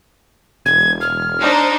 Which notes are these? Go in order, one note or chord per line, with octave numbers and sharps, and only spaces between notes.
E1 G#6
F6
D4 D#4 C5